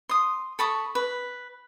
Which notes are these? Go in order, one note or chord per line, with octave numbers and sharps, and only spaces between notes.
C6 D#6
A4 B5 C#6 D#6
B4